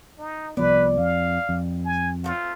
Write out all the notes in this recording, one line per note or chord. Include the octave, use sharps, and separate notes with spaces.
D#4
C2 F3 B3 B4 D5
F2 F5
F2
G#5
A3 A#3 C4 F4